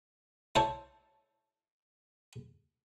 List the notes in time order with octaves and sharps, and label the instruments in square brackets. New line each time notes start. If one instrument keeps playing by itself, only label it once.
[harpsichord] E4 C5 C#5 A5